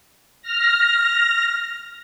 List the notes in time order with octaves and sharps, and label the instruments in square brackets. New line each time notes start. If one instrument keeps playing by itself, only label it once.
[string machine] F6 A#6